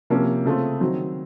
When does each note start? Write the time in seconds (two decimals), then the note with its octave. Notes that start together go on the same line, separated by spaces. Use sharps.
0.10 C3 F3 A#3 C#4
0.45 C#3 A3 C4 F4
0.81 D#3 F#3 C4